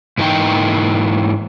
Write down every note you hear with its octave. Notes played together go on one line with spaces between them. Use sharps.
G#2 E3 A#3 D#4 G5